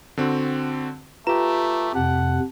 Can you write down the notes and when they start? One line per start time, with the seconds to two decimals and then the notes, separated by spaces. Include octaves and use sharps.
0.17 D3 C4 F#4
1.27 A3 F4 G4 B4 A#5 E7
1.95 F2 C3 F#5 A5